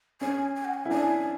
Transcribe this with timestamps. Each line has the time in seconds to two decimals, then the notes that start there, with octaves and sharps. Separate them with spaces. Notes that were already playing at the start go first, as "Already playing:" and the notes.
0.21 C#4 G#5
0.56 G#5
0.65 F#5
0.74 G#5
0.85 E4
0.91 D4 G#5